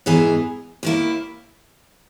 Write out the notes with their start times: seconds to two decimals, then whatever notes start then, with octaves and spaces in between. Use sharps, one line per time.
0.06 G#2 E3 B3 D#4 G#4
0.83 D#2 D#3 A#3 E4